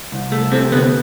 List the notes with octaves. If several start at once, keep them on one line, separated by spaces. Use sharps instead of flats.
C2
A3
C3 C4
D2 B3